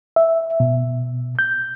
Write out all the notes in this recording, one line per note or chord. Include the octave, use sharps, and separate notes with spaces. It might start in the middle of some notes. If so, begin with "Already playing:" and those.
E5
B2
G6